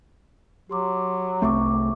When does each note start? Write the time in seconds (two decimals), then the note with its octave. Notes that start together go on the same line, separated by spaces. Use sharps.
0.69 F#3 G4 C6 D6
1.42 C2 A3 C4 E5 C#6 D6